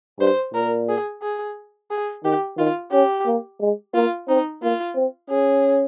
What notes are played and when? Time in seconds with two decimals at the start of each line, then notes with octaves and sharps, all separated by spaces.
0.19 G2 C5
0.54 A#2 A#4
0.89 G#4
1.22 G#4
1.90 G#4
2.24 D#3 G4
2.58 D#3 F4
2.92 C#4 G4
3.26 A#3
3.61 G#3
3.94 A#3 F4
4.28 C4 D#4
4.63 A#3 F4
4.96 C4
5.30 C#4 G#4